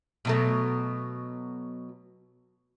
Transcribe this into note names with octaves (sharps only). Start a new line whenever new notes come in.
B2 F#3 A3